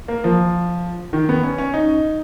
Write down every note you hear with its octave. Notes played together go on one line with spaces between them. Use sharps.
A#3
F3
D#3
B3
C#4
C#4
D#4